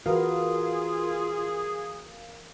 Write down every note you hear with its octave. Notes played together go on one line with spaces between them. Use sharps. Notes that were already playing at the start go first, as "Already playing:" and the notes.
E3 F4 F#4 G#4 A#4 B4 F5